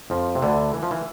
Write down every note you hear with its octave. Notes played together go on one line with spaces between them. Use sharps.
F2 F3
C3
D2 D3
E3
F3
E3